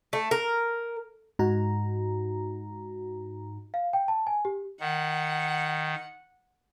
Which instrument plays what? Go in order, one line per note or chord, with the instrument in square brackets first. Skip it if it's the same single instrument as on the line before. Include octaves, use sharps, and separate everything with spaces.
[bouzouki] A3
A#4
[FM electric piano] G#2 D#4 F#4 A#5
[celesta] F5
G5
A5
G#5
G4
[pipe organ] D#3 [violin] F#5